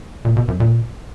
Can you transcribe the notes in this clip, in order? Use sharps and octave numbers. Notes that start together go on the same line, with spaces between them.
A#2
B2
F#2
A#2